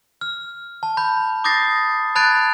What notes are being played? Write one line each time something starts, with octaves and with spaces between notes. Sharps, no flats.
F6
A5
B5 G6
D6 D#6 G6 A6 A#6 C7
A5 B5 F#6 G#6 A6 D7